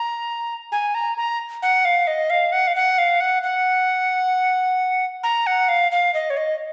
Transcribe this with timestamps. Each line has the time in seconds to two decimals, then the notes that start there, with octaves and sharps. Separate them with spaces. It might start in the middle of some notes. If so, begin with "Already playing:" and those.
Already playing: A#5
0.72 G#5
0.95 A#5
1.17 A#5
1.62 F#5
1.85 F5
2.07 D#5
2.30 F5
2.52 F#5
2.67 F5
2.76 F#5
2.98 F5
3.20 F#5
3.43 F#5
5.23 A#5
5.47 F#5
5.69 F5
5.92 F5
6.14 D#5
6.30 C#5
6.37 D#5